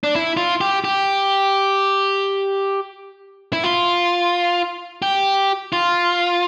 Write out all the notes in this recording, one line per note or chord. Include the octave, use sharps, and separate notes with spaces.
D4
E4
F4
G4
G4
E4
F4
G4
F4